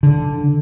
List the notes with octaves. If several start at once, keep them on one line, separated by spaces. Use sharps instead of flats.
D3